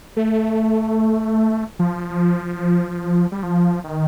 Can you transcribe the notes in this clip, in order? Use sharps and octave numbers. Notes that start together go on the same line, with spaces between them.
A3
F3
G3
F3
D#3